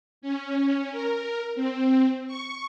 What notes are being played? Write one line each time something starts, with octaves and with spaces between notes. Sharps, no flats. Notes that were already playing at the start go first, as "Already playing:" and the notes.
C#4
A#4
C4
C#6